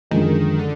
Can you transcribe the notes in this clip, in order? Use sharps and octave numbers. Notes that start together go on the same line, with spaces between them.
F#2 D3 D#3 F3 G#3
D3